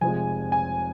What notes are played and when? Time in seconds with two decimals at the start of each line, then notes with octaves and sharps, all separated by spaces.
0.01 F1 F2 C3 F3 G#3 G#5
0.52 G#5